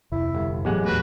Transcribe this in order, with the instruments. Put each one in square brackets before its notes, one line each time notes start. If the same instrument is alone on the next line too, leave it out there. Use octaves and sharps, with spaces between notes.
[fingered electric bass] D1 F2 C3 [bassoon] E4
[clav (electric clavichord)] G1
[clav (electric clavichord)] A1 G#3 F#5 [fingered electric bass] F#3 B3 [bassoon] G4
[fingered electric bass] E2 A#2 A3 [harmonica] F#4 B4